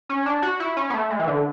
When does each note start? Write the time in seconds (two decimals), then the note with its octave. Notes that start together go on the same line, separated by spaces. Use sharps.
0.09 C#4
0.26 D4
0.43 F#4
0.60 E4
0.77 C#4
0.90 B3
0.94 A3
1.10 G#3
1.19 E3
1.27 D3